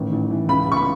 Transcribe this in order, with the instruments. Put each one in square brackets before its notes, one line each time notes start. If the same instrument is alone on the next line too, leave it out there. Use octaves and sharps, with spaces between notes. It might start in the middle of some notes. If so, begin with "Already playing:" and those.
Already playing: [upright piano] A1 D#3
A1
E3
C#2 B5
C#2 C#6
B5